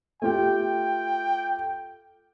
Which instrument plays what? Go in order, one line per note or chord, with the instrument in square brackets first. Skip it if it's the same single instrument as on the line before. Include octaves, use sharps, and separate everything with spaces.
[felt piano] A3 F4 G4 [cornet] G5